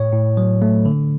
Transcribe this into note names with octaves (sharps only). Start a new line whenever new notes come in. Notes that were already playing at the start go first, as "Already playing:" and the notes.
Already playing: A2 C#5
A2
F#3
A3
D3